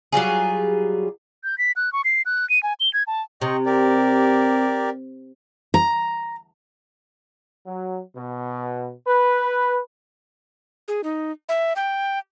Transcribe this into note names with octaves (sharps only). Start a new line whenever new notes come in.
F#3 G3 F4 G#4
G6
B6
F#6
C#6
C7
F#6
D#7
G#5
G7
G#6
A5
C3 D#5 G5 C#6
G4 A#4 D5
A#5
F#3
B2
B4
G#4
D#4
E5
G5